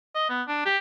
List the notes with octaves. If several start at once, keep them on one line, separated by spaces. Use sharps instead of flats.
D#5
B3
D4
G4